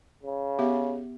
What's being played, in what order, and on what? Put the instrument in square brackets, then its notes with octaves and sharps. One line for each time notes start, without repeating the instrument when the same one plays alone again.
[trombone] C#3
[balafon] B3 G4 E5